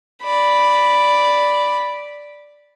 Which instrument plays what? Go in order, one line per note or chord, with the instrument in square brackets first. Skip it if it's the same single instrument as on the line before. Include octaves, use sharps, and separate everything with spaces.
[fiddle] D5 B5